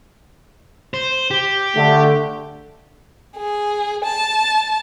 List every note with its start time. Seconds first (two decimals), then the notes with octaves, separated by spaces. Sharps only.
0.94 C5
1.31 G4
1.76 D3 A3
3.36 G#4
4.04 A5